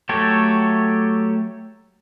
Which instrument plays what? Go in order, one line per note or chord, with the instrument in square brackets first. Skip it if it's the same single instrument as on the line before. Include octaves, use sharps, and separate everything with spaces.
[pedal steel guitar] F#3 A3 G4 A4 C#5